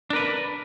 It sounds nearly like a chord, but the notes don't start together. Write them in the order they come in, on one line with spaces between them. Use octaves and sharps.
D4 A#4 B4